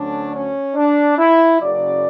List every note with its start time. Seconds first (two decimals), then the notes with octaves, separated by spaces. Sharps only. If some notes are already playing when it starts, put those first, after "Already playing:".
Already playing: D2 D3 F#3 A3 C#4 D4
0.33 C#4
0.75 D4
1.18 E4
1.60 F#1 F#2 C#3 F#3 D5